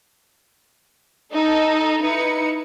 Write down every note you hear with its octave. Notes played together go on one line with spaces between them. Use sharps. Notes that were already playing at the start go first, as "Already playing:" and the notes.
D#4 A4
D#4 E4 B4 C#7